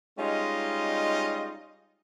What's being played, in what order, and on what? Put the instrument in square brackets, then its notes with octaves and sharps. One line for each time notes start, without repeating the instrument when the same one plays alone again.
[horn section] G3 G#3 C#4 D#4 F4 D#5